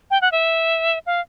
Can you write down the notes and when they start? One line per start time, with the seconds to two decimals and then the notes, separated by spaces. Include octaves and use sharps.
0.11 G5
0.22 F#5
0.32 E5
1.06 F5